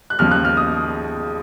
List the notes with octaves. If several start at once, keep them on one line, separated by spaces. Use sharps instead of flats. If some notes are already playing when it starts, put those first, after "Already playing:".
F#6
D#2 C#3 F3 F6
F#6
F6
D#6